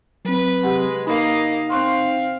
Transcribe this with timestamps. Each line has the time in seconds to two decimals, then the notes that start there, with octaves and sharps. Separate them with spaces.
0.25 F#3 C4 B4
0.63 C3 G#3 G4 F#5
1.07 A#3 D#4 D#5 F5 B5
1.70 C4 F5 C6 C#6 F#6